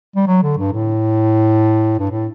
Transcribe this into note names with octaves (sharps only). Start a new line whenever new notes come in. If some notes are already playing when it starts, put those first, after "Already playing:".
G3
F#3
D3
G2
A2
G2
A2